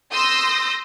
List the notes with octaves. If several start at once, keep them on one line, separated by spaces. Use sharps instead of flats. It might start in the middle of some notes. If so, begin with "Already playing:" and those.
C6 D#6 E6 G6 A#6